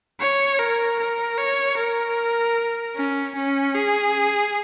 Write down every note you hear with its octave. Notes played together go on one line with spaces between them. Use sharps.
C#5
A#4
A#4
C#5
A#4
C#4
C#4
G#4